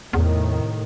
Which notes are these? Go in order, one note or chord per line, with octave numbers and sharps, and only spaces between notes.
E2 A2 C3 D#3